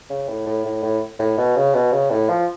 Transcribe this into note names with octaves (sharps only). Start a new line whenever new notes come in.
C#3
A2
A2
A2
A2
A2
B2
C#3
B2
C#3
A2
F3